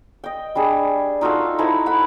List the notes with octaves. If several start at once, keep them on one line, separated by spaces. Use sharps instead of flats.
D#5 G5
G3 D4 G#4
D#4 F4 F#4 A4
D#4 E4 A4 C5
F#5 B5